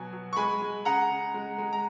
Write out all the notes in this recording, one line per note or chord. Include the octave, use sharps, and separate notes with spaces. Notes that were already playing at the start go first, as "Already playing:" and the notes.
Already playing: B2 F#3 G#5
F#3
C#6
G#3 G#5 B5
G#3
C#3 F#5 A#5
C#3
G#3
G#3
A#5